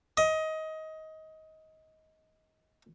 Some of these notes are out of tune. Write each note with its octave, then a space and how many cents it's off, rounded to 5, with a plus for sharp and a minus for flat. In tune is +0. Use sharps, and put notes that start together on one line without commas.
D#5 +20